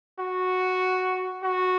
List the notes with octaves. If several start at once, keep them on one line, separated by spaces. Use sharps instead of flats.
F#4
F#4